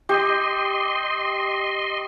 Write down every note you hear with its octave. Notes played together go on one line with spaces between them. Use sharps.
G4 D#5 C6